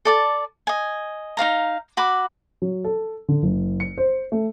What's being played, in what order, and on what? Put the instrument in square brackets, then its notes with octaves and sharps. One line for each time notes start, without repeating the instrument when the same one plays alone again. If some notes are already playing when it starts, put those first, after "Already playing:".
[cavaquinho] A4 D5 A5
D#5 G#5
D#4 F#4 F5 A#5
F#4 B5 D6
[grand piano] F#3
A4
D3
F#1
C#7
C5
A3